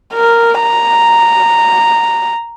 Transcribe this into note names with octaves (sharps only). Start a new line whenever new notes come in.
A#4
A#5